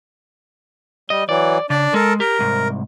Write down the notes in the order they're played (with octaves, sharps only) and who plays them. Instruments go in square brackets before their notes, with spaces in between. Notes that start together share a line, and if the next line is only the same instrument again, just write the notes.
[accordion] G3 [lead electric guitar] D#5
[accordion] E3 F#3 [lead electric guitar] D5
[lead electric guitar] C#3 [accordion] D4 D5
[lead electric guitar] G#3 [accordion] A4 A#4
[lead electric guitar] G4 [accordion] A#4
[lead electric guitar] C2 G#2